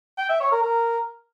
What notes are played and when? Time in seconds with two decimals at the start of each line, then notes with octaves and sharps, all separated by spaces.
0.18 G5
0.29 E5
0.40 C#5
0.52 A#4
0.63 A#4